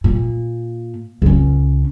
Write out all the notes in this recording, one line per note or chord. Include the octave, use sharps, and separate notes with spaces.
A#2
C#2 C#4